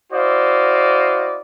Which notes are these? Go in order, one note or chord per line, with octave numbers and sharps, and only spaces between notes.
E4 F#4 C5 D5 D#5 F5